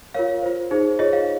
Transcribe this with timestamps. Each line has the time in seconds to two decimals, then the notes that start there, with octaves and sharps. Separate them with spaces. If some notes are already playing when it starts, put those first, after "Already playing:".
0.14 F4 A#4 C#5 F5
0.42 F4 C5
0.71 D#4 G#4 C5
0.99 F4 G#4 C#5 D#5
1.13 F5